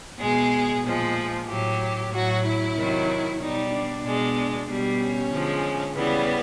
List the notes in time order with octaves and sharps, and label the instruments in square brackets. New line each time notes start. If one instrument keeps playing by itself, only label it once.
[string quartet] B2 G#3 G#4
A#2 F3 G#3
A2 F#3 G4
A2 F#3 F#4
E4
C3 D#3 F#3
B2 G3 D#4
D4
B2 G#3
B2 G3
C#4
D3 F3 G#3
C#3 E3 G3 B3